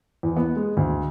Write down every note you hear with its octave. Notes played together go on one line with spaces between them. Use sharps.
E2
B3
G#3
D2